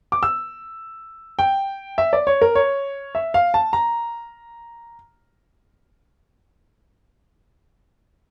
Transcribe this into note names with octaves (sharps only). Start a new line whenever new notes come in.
D6
E6
G5
E5
D5
C#5
A#4
C#5
E5
F5
A5
A#5